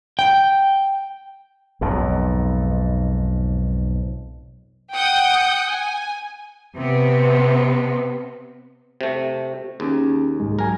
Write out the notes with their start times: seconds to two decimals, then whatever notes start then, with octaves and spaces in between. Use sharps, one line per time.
0.19 G5
1.81 B1 F2 G#2
4.94 F#5 G5 D#6 G6
5.65 G#5
6.76 C3 B3
9.01 C3 A3
9.80 D#2 C#4 G#4
10.40 C2 G#2 G#3
10.59 F#3 A#4 G#5